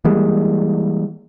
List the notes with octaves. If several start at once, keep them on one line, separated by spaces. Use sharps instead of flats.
E3 G3 G#3 A#3